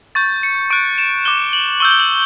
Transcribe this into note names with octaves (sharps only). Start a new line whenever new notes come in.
C#6 G6 A6
C#7
C#6 F#6 D7
E7
D6 F#6 G7
F#7
C#6 E6 G6 G7
G7
F#7